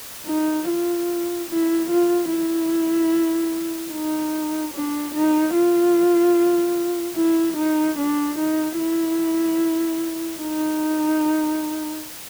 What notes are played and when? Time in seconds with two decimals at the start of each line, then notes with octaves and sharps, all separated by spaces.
0.27 D#4
0.68 F4
1.49 E4
1.90 F4
2.30 E4
3.91 D#4
4.73 D4
5.14 D#4
5.55 F4
7.16 E4
7.56 D#4
7.97 D4
8.38 D#4
8.78 E4
10.41 D#4